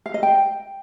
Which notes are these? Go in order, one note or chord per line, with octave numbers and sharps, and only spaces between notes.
F5
D#5
G5